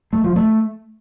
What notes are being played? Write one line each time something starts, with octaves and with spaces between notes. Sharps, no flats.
A3
F3
A3